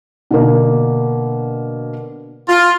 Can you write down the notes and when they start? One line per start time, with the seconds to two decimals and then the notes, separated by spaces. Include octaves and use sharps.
0.31 B2 D3 A#3
2.49 F4